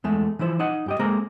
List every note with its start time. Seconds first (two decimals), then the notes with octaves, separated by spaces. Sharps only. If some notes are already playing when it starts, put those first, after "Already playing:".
0.04 E2 G#3 A3
0.39 E3 F3 E4 C5
0.59 D#4 D#5 F#5
0.86 G2 G4 D#5
0.99 G#3 A#3 C4 A#5